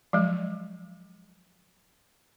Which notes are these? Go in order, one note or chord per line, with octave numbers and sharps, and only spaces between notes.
F3 F#3 G#3